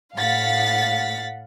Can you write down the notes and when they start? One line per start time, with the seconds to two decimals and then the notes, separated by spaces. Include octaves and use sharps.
0.16 A2 F5 F#5 A6 B6